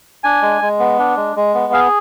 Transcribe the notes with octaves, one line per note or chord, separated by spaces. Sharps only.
D4 G#5
G#3
G#3
B3
D4
G#3
G#3
B3
G#4 F5